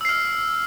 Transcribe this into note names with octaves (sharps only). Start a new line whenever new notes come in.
E6 F6 C7